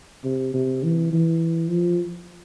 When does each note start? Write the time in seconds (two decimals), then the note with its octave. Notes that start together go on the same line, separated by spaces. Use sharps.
0.24 C3
0.54 C3
0.83 E3
1.13 E3
1.70 F3